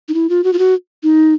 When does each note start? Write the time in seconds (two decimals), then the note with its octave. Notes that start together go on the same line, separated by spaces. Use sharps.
0.09 D#4
0.14 E4
0.29 F4
0.44 F#4
0.53 F4
0.59 F#4
1.03 D#4